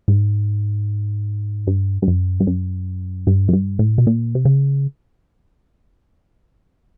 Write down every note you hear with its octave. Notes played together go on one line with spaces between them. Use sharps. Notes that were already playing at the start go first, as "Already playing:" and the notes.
G#2
G2
G2
F#2
G2
F#2
G2
F#2
G2
A2
B2
A#2
C3
C#3